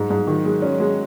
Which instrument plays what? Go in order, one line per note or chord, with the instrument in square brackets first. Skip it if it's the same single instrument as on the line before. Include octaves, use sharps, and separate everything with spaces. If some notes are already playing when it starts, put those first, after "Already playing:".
Already playing: [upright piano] G#2 [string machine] F#3
[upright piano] G#2
D#3
G#3
C#4
G#3